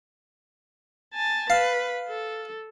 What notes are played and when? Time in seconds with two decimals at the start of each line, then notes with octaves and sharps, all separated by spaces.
1.14 G#5 A5
1.50 B4 F5
2.08 A4